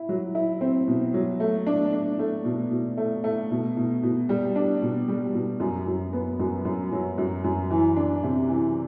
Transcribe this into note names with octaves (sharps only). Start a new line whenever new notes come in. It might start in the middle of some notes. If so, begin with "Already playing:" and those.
Already playing: E4
F#3
E4
C4
B2
F#3
A3
D4
D4
A3
B2
B2
A3
A3
B2
B2
B2
G3
D4
B2
G3
B2
F#2
F#2
B3
F#2
F#2
F#3
F#2
F#2
E3
D4
C3
E3